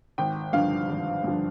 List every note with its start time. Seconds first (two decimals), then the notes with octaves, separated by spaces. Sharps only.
0.18 G#1 G5
0.53 G2 D3 F3 F5
0.89 G#1
1.24 G2 D3 F3